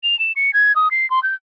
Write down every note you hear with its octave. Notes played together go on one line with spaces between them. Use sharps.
F7
E7
C#7
G#6
D#6
C7
C6
G6